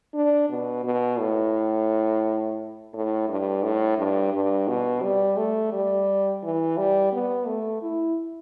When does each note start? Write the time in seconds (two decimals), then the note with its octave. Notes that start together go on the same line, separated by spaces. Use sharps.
0.14 D4
0.49 B2
0.84 B2
1.19 A2
2.94 A2
3.28 G2
3.63 A2
3.98 G2
4.33 G2
4.68 B2
5.03 G3
5.37 A3
5.73 G3
6.43 E3
6.78 G3
7.12 B3
7.47 A3
7.82 E4